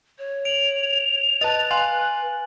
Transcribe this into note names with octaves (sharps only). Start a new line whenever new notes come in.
C#5
D7 F7 F#7
B4 D#5 A5 A6
F5 G#5 C6 F#6 F#7